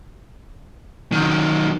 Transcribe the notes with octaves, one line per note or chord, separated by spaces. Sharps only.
D#3 F#3